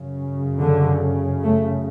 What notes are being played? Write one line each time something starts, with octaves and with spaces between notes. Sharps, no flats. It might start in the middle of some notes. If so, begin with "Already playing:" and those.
Already playing: F#2 C#3
D3
A3